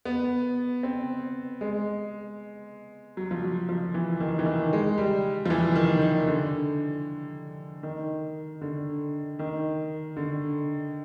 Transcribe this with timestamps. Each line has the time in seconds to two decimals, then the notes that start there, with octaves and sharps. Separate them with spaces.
0.05 B3
0.83 C4
1.61 G#3
3.17 F#3
3.31 F3
3.42 F#3
3.69 F3
3.94 E3
4.20 D#3
4.39 E3
4.46 D#3
4.73 G#3
4.98 G3
5.46 F3
5.50 E3
5.76 D#3
6.02 D#3
6.28 D3
7.83 D#3
8.61 D3
9.39 D#3
10.17 D3